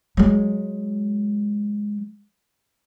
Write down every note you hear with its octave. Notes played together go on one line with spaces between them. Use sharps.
F#3 G#3